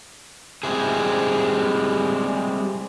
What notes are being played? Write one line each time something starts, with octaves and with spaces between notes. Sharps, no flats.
G3 G#3 C4 E4 G#4